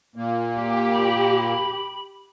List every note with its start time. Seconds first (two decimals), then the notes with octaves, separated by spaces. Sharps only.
0.16 A#2 A#3
0.58 G4
0.92 B5